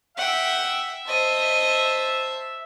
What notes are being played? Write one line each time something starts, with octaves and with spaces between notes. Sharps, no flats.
E5 F#5 G5
C5 D#5 A5